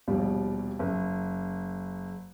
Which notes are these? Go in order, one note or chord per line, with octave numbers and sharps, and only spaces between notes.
A#1 D#2 B2 G3
F#1